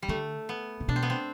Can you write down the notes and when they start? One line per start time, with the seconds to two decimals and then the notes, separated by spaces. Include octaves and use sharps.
0.02 G3
0.08 D3 A3
0.49 B3
0.80 C3
0.88 B2 D4
0.96 C4
1.03 B3
1.10 C4